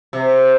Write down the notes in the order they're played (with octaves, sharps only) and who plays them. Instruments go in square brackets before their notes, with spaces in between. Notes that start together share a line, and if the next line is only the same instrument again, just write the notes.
[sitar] C3